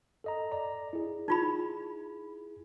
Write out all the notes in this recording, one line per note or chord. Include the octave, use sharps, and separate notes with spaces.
A4 D#5 A#5
D5 A#5
E4 G#4
D#4 F4 B5